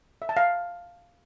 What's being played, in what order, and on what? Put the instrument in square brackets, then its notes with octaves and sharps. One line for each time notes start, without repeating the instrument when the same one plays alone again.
[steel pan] E5
A5
F5